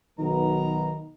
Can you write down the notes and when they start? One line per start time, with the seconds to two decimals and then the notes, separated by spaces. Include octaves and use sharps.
0.18 B1 D#3 B3 A#5